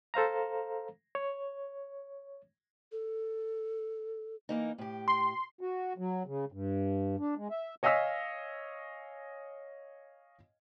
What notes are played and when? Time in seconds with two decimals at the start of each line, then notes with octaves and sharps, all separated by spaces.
0.14 A4 C5 F5 A#5
1.15 C#5
2.92 A4
4.49 E3 A#3 D#4
4.78 A2 G4
5.08 C6
5.61 F#4
5.98 F#3
6.26 C#3
6.52 G2
7.20 D4
7.37 G#3
7.51 E5
7.83 C#5 D#5 F5 G#5 E6 B6